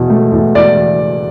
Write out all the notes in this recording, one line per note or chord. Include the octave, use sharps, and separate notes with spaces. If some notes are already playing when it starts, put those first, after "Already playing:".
Already playing: E2 B2
A3
E2
E2 D5